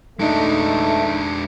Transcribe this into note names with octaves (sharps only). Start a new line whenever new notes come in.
G#3 A3 D4 D#4